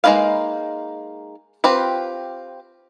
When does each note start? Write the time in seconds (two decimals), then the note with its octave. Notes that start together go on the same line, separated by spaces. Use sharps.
0.04 G#3 A#3 D#4 B4 F5
1.64 C4 F4 G4 B4